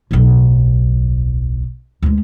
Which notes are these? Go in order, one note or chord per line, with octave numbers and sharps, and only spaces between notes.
D1 B1
D2 G#3